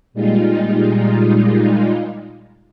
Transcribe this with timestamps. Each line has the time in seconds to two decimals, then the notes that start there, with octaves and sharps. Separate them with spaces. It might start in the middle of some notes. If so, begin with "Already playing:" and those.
0.14 A#2 G3 G#3 D#4 F4